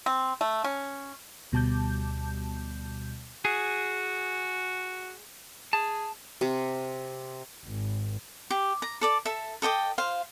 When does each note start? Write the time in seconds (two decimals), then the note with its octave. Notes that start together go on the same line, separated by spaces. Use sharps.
0.06 C4
0.41 A3
0.64 C#4
1.52 D2 B2 G3 A5 D6 G6
3.45 F#4 G#4
5.73 G#4 A5
6.41 C3
7.65 G#1
8.50 G4
8.82 A#5
9.01 A4 D5 D6
9.25 A4 E5
9.62 A4 D#5 G5 D6
9.98 F4 C5 F5